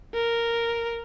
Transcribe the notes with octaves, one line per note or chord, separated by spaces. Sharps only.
A#4